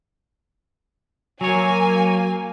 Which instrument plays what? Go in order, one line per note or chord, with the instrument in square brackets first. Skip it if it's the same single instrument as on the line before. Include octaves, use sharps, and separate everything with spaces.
[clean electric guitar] F#3 C#5 [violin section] A#3 G#5